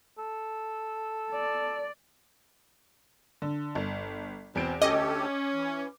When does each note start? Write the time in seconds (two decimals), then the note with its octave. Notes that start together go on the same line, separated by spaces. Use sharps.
0.18 A4
1.32 D5
3.42 D3
3.75 G1
4.55 E2 B2 C4 D7
4.82 D2 C#4 G4 A4 D#5 D6
5.53 E3